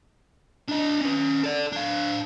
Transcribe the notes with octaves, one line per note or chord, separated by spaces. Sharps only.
D4 D#5
C#4 B4
A4 D5
D4 F5